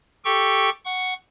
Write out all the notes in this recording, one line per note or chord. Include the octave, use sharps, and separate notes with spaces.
G4 A4 G5 C#6
F#5 C#6